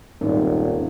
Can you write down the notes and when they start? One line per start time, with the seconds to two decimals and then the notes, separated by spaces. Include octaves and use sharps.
0.21 D#1 G#1